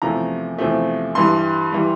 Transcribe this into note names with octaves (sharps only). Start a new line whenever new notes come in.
E2 C3 F3 A3 A#5
E2 C3 F3 A3
G2 E3 G3 C6
E3 G3